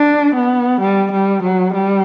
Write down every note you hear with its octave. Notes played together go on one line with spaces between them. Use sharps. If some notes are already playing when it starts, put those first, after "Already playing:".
Already playing: D4
B3
G3
G3
F#3
G3